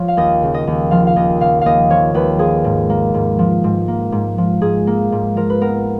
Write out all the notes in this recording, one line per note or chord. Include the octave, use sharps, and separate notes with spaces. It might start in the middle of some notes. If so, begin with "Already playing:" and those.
Already playing: F3 C#5
F5
D#2 D#5
C#3
D#5
D#2
F3 F5
F5
D#2 D#5
C#3 F5
D#2 D#5 F5
F3 C#5
D#2 B4
F3 G#4
G#2
A#3
G#2
F3
G#2
A#3
G#2
F3
G#2 G#4
A#3
G#2
F3 A#4
B4
B3 A#4